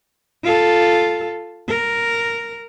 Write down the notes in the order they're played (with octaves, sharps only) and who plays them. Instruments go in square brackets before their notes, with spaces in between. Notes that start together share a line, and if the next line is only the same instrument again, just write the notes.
[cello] F4 A4
A#4